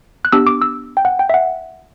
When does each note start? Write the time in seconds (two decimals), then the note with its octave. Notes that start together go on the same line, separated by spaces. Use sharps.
0.25 F#6
0.32 B3 D4 G4 E6
0.47 D6
0.62 E6
0.97 G5
1.05 F#5
1.19 G5
1.30 E5
1.34 F#5